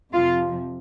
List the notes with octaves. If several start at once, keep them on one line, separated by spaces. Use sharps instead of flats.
F2 C3 F3 F4